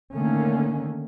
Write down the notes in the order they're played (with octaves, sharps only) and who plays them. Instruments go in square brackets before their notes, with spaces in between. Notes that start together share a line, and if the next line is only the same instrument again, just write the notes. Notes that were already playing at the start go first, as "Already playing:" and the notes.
[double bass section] D3 D#3 A3 A#3 C#4